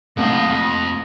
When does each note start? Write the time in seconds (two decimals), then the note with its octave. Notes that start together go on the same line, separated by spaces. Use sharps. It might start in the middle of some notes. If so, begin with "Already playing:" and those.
0.17 C2 A2 D#3 F#3 A3 A#3 D#5 F5
0.46 F2